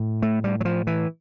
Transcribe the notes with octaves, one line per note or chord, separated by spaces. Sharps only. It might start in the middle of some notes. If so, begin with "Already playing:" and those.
Already playing: A2
A3
G3
F#3
F3
E3